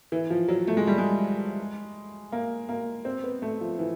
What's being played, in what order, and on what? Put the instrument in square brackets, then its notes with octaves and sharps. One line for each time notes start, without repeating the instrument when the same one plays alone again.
[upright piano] E3
F3
F#3
A3
G#3
G3
G#3
A#3
A#3
C4
B3
A3
F3
E3